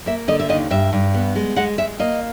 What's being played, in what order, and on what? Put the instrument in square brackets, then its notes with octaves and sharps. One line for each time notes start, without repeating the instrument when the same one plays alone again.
[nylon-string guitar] A#3 E5
D3 D#5
E5
D#2 D#5
G2 E5
G2
B3
G#3
G#3 F#5
G#3 E5
A#3 D#5